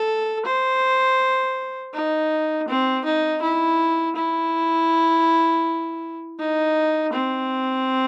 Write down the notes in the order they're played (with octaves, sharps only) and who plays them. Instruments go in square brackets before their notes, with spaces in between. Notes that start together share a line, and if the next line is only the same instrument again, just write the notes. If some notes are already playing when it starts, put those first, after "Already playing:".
Already playing: [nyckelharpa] A4
C5
D#4
C4
D#4
E4
E4
D#4
C4